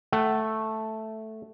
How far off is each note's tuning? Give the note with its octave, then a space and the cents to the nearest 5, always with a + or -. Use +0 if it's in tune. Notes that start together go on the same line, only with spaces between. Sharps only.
A3 +0 F#5 +30